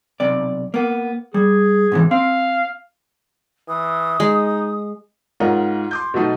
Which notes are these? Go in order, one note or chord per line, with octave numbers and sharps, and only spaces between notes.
B1 C3 D5
A#3 B3
G3 G#4
G#2 C3 E3
C4 F5
E3 D#6
G#3 D#4
G#2 D#4 F4 A#4 C#5 F#5
C6 D6 G6
B2 F#3 A3 D#4